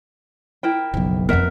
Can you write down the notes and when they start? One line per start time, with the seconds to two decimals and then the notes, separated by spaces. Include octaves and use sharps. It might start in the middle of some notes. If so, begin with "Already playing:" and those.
0.63 E4 A#4 G5
0.94 F#1 B1 F3
1.29 F2 B3 A#4 E5 F#5